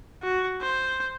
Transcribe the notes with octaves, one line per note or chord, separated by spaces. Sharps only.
F#4
C5